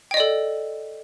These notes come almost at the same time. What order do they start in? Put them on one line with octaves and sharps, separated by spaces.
G5 D#5 D5 A4